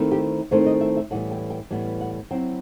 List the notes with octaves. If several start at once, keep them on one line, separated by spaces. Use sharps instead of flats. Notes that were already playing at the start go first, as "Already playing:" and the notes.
Already playing: D#3 A3 C4 E4
G4
D#3 A3 C4 E4 C5
D#5
E5
E5
A2 E3 G3 B3 F#5
G5
G5
A2 E3 G3 B3 G5
F#5
F#3 C4 E4 G5